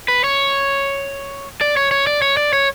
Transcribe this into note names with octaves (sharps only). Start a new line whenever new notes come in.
B4
C#5
D5
C#5
C#5
D5
C#5
D5
C#5